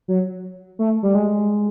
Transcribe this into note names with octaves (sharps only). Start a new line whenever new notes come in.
F#3
A3
G3
G#3